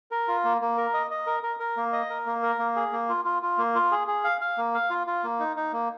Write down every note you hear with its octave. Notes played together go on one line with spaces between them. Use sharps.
A#4
F4
A#3
A#3
A#4
D#5
D#5
A#4
A#4
A#4
A#3
D#5
A#4
A#3
A#4
A#3
G#4
A#3
F4
F4
F4
A#3
F4
G#4
G#4
F5
F5
A#3
F5
F4
F4
A#3
D#4
D#4
A#3